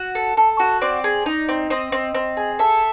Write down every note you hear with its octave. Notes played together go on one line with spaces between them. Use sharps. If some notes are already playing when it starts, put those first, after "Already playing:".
Already playing: F#4
A4
A4
F#4
C4 D5
G#4
D#4
C4
C4 D#5
C4
C4
G#4
A4 E5